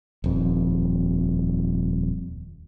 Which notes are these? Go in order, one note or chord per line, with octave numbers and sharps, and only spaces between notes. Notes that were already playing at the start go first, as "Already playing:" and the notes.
D#1 F2